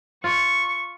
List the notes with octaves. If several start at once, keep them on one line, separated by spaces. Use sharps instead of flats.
F4 C#6